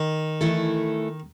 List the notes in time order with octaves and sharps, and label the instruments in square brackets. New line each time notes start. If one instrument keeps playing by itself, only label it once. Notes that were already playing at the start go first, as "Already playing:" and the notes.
Already playing: [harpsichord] D#3
[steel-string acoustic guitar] E3 A3 E4 A4